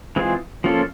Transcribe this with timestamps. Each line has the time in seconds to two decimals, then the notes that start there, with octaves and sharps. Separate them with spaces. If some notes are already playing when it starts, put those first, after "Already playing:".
0.16 E3 G#3 C4 F4 G#4
0.64 F3 A#3 C#4 F4 A4